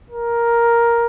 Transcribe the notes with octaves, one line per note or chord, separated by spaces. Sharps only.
A#4